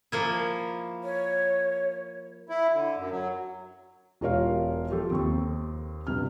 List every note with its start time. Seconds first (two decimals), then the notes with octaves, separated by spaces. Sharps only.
0.12 F3 A#3 E4
1.04 C#5
2.49 E4
2.72 D3
2.97 F#2
3.10 F#3
4.21 E1 F4 G4 A#4 C#5 F5
4.90 F3 F4 G4 A4
5.11 D#2 C4 C#6
6.07 G2 C3 F6